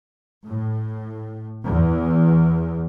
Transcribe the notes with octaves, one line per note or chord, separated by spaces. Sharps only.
A2
E2